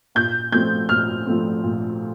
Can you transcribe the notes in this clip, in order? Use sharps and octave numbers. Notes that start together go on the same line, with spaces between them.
A#2 G6
F3 A3 C4 G6
A#2 F6
F3 A3 C4
A#2